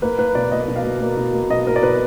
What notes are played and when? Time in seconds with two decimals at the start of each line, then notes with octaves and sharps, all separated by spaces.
0.02 A#3 B4
0.18 A#3 B4
0.35 B2 D5
0.52 A#3 D#5
0.68 B2
0.76 F5
0.84 A#3
1.01 A#3
1.17 B2
1.34 A#3
1.50 B2 D#5
1.67 A#3 A#4
1.76 D5
1.83 B2 B4